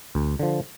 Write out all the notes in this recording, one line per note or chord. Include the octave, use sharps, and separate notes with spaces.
D2
D3 F3